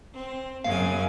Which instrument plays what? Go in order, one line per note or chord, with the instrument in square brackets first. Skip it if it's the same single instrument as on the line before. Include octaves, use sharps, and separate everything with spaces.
[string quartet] C4
[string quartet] F#2 C#3 G#5 [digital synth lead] F5